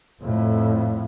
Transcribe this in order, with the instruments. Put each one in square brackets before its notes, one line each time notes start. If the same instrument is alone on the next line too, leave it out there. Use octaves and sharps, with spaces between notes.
[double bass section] F2 A2